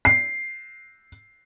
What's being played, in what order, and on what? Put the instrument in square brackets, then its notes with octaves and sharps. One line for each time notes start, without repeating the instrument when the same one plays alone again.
[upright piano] C7